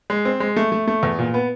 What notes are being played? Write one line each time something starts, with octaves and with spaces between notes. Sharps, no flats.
G#3
C4
G#3
A3
A3
A3
E2
A#2
B3